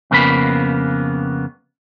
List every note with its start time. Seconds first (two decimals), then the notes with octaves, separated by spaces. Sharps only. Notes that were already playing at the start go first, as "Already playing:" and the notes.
0.11 F2 C#3 A#3 B3 B5